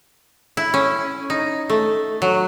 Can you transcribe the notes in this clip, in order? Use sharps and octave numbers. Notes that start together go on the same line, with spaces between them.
E4
C#4
D#4
A3
F#3